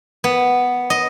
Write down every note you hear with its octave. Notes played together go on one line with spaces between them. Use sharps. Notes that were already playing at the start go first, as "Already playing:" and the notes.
B3
D#5